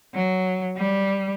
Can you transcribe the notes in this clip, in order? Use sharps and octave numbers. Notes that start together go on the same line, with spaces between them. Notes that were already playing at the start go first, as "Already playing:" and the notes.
F#3
G3